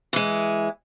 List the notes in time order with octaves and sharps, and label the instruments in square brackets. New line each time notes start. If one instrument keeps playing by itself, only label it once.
[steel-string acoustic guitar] E3 G#3